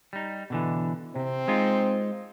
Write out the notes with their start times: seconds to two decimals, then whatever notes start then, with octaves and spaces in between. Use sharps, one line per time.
0.13 G3 D#4
0.50 B2 D3 E3
1.16 C3 C4
1.48 G#3 D#4 F4